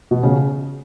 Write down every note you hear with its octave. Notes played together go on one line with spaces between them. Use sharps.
B2
C#3